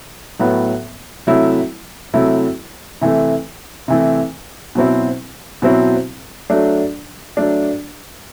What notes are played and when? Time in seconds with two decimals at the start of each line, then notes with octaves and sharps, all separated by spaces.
0.39 A2 F#3 B3
1.27 C3 F#3 A3 E4
2.14 C3 F#3 A3 E4
3.01 C3 E3 A3
3.88 C3 E3 A3
4.75 B2 F#3 C4 E4
5.62 B2 F#3 C4 E4
6.50 F#3 A3 D4
7.37 F#3 A3 D4